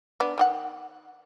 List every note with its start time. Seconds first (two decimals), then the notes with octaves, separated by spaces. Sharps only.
0.20 B3 D4
0.38 D#3 G4 F#5